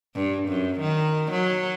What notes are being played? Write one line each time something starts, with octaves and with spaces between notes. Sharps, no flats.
G2
F#2
D#3
F#3